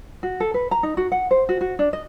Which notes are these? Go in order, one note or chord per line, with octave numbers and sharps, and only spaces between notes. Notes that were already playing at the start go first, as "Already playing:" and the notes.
F#4
A4
B4
A#5
D#4
F#4
F#5
C5
F#4
F#4
D4
D#5